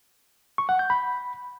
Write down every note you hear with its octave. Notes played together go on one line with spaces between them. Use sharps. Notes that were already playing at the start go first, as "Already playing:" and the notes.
C#6
F#5
G6
B5